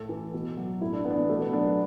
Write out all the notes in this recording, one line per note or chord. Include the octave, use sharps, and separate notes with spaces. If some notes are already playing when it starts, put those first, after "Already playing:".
Already playing: A2 A4
E3
B2
F#3
A2 E4
D4
E3 B3
D4
B3
B2 A3
B3
F#3 D4
B3